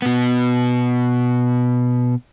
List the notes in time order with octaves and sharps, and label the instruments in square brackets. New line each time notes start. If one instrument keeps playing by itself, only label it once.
[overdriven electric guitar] B2 B3